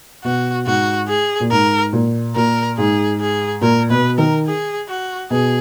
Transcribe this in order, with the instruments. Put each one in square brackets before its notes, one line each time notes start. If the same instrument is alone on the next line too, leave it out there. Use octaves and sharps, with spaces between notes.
[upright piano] B2 [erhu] F#4
[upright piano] G#2 [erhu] F#4
[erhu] G#4
[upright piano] A#2
[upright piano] G#2 [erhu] A#4
[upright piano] A#2
[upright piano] A#2 [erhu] A#4
[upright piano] G#2 [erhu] G#4
[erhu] G#4
[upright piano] A#2 [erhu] A#4
[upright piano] B2 [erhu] B4
[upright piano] D#3 [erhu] A#4
[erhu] G#4
F#4
[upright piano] B2 [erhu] G#4